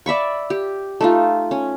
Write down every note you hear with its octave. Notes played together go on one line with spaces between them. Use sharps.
D5 E5 B5 C#6
G4
A3 D#4 F4
C#4